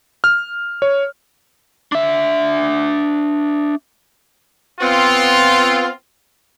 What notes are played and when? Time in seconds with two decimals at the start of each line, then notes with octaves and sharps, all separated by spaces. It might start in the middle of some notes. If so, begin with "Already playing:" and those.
0.24 F6
0.82 C#5
1.92 D4 E5
4.80 B3 C4 F4